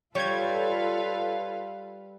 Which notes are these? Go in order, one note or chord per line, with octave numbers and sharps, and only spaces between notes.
G3 F4 A4 B4 C#5 F5 G6 G#6